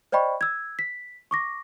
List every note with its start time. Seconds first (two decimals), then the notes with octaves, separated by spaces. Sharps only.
0.12 C5 D5 D#5 G5 B5 C#6
0.41 E6 G#6
0.79 B6
1.31 C#6 D6 A#6